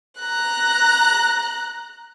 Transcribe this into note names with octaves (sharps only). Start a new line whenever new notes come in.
A#5 F#6